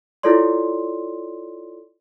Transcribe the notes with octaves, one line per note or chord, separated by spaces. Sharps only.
E4 F4 A4 C#5 D5 C6